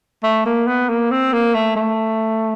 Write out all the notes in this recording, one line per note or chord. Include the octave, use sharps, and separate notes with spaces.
A3
A#3
B3
A#3
C4
A#3
A3
A3